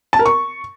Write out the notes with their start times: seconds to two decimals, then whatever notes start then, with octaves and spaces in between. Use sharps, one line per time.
0.13 A5
0.19 A#4
0.26 C#6